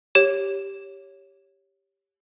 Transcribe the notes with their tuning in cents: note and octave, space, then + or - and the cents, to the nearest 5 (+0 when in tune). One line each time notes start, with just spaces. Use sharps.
G4 +0 C#5 +0